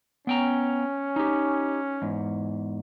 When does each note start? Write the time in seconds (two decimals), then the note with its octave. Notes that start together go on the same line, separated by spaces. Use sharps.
0.27 B3 C#4 G5 A#5
1.16 D#4 G4
2.02 E2 G#2